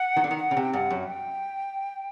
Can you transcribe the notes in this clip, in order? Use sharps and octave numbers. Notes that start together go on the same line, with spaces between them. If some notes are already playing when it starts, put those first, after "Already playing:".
Already playing: F#5
D#3
D3
D#3
F#5
C#3
C3
G5
G2 F#5
F#2
G5